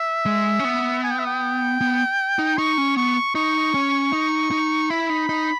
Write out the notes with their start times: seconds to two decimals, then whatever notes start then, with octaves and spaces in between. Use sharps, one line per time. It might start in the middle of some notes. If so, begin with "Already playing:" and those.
Already playing: E5
0.26 G#3
0.59 C#4
0.64 B3
1.03 G#5
1.11 G5
1.19 E5
1.26 G5
1.81 B3
2.39 D#4
2.57 D#4 C#6
2.78 C#4
2.96 B3 C#6
3.35 D#4 C#6
3.74 C#4
4.13 D#4
4.51 D#4
4.90 E4 B5
5.10 D#4
5.29 D#4